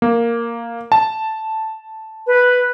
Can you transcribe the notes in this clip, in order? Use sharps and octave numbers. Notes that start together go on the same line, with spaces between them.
A#3
A5
B4